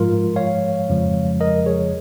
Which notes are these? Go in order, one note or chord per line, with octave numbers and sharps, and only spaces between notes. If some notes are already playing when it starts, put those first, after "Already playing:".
Already playing: G#2 F3 G#3 F4 A#4
C#5 F5
F2 C#3 F3 G#3
A#4 D#5
G#4 C#5